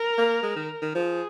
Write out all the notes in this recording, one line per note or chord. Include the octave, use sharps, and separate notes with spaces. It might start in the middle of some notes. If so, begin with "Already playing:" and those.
Already playing: A#4
A#3
G#3
D#3
D#3
F3 G#4